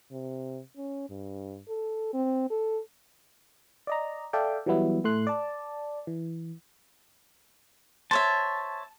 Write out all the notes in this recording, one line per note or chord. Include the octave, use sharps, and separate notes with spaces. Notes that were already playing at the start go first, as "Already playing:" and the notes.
C3
C#4
G2
A4
C4
A4
D5 D#5 A#5
A4 D5 E5 F5 G5
E3 F#3 G3 B3 E4
A2 A3 C6 F#6
D5 A5
E3
C5 C#5 E5 A5